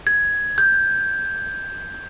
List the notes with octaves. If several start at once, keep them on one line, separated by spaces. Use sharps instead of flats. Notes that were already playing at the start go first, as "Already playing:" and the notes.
G#6
G6